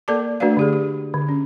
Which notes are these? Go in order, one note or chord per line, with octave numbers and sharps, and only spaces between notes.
A#3 A4 A#4 D5 A5 D6
A3 D4 F#4 B4 D5 F5
D3 G4 G#4
G4
D3
C#4